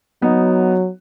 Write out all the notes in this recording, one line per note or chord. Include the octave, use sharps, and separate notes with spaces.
F#3 B3 D#4